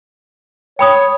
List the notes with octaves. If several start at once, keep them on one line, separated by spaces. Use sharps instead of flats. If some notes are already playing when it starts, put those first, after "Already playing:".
C#5 G5 B5 D#6